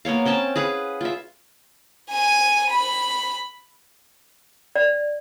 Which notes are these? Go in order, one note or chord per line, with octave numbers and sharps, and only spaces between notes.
A#3 B3 C#5 F5
C4 C#4 G5 A5
G#4 B4 F5 F#5
F4 E5
G#5 D#7
B5
D5